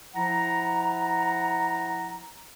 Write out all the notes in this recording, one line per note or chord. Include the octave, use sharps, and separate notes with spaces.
F3 E4 F#5 A#5